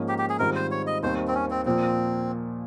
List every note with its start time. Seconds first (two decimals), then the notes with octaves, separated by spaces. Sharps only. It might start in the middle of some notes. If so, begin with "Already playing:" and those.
Already playing: G#2 F3 A#3 C#4
0.08 G4
0.18 G4
0.30 G#4
0.39 G#2 D#3 G3 C4 F4 A#4
0.56 C5
0.71 C#5
0.87 D#5
1.03 D#2 D#3 G3 C4 C5
1.28 C4
1.34 C#4
1.51 C4
1.65 A#2 F3 A#3 C4